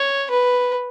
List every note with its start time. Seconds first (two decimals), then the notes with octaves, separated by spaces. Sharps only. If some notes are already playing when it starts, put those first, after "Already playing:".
Already playing: C#5
0.31 B4